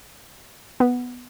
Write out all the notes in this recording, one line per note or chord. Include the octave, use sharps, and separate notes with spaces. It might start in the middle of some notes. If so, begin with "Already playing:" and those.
B3